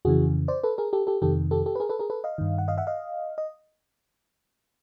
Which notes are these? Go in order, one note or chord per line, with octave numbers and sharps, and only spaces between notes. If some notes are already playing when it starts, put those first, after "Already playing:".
F2 C#3 E3 F#4 G#4
C5 D5
A4 B4
G#4 A#4
G4 A4
G4 A4
F2 C3 D#3 G4 A4
G4 A4
G4 A4
B4
G#4 A#4
A4 B4
G#4 A#4
A4 B4
D#5 F5
G2 D#3
F#5
D#5 F5
E5 F#5
D#5 F5
D#5